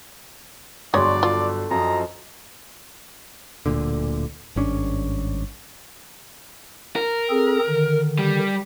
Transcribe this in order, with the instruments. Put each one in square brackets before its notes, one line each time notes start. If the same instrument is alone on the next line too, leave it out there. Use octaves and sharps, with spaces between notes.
[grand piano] G1 F#3 [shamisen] G#3 C#5 [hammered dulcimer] D4 C6 C#6 [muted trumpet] D5
[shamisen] F4 [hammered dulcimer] A4
[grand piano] F#2 [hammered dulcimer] F3 D#5 [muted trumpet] A#5
[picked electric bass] D1 D2 A#2 D3
G#1 G2 C#4 D4
[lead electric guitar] A#4
[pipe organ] C4 G#4 A4
D3 D#3
[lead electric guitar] G3